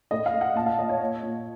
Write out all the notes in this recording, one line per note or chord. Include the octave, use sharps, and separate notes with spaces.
A2 D#5
F5
A2
F#5
A#2 A5
F5
A#2 D#5
C#5
A#2
A#2